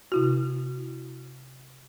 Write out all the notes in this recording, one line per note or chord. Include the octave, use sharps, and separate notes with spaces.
C3 E4 F#4